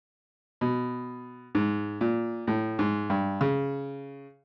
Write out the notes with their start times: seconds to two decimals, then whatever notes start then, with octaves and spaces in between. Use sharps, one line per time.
0.61 B2
1.55 G#2
2.01 A#2
2.47 A2
2.79 G#2
3.10 G2
3.41 C#3